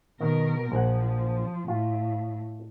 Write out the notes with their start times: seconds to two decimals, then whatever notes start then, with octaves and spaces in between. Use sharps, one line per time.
0.21 B2 D#3 A#4
0.72 A#1 F3 F#5
1.68 A2 F4